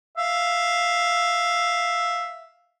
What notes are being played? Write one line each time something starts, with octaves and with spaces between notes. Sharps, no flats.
E5 F5